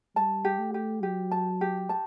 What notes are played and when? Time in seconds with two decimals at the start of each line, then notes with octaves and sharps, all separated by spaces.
0.16 G3 A5
0.45 G4
0.59 A3
0.74 G4
1.03 F#3 G4
1.31 A5
1.61 G4
1.89 A5